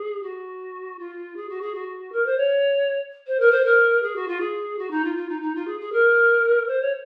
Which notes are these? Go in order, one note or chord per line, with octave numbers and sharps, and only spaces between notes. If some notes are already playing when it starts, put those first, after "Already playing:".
Already playing: G#4
F#4
F4
G#4
F#4
G#4
F#4
A#4
C5
C#5
C5
A#4
C5
A#4
G#4
F#4
F4
G#4
F#4
D#4
F4
F4
D#4
D#4
F4
G#4
G#4
A#4
C5
C#5